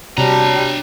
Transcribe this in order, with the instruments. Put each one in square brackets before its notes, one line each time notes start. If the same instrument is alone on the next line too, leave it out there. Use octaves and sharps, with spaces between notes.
[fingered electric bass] C3 [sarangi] G3 [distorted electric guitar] D4 A#5 [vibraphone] F#4 C#5 A5